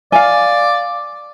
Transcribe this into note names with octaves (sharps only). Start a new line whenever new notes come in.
D5 F5 G#5